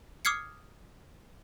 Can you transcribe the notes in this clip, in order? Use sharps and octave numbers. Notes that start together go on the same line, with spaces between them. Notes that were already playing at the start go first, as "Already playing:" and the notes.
D6 D#6 F6 G#6 C7 C#7